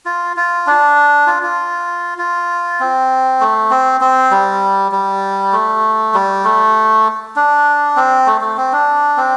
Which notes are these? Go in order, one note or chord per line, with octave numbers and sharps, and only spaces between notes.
F4
F4
D4
F4
F4
F4
C4
A3
C4
C4
G3
G3
A3
G3
A3
D4
C4
A3
A3
C4
D4
C4